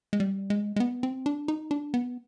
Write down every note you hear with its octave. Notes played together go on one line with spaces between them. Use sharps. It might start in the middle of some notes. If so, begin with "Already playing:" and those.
G#3
G3
G#3
G#3
B3
C4
D4
D#4
D4
B3